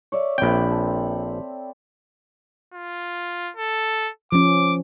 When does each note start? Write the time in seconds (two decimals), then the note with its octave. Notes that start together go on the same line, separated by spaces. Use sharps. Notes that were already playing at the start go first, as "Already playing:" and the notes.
0.12 C#5 D5 E5
0.38 A#1 C4 G5 B5
0.70 A4
2.74 F4
3.57 A4
4.32 F3 C#4 D6